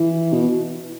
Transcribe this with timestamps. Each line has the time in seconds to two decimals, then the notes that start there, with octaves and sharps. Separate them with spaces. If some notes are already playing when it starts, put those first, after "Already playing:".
Already playing: E3
0.33 B2